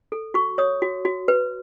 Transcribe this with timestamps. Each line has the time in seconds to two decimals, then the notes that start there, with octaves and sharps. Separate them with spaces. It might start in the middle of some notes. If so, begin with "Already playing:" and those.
0.12 A4
0.34 F#4 C#6
0.58 C#5 D#6
0.82 F#4
1.05 F#4
1.28 B4